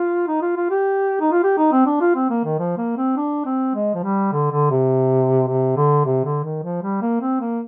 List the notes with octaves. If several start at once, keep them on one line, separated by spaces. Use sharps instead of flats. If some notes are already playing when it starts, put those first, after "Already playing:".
Already playing: F4
D#4
F4
F4
G4
D#4
F4
G4
D#4
C4
D4
F4
C4
A#3
D#3
F3
A#3
C4
D4
C4
G#3
F3
G3
D3
D3
C3
C3
D3
C3
D3
D#3
F3
G3
A#3
C4
A#3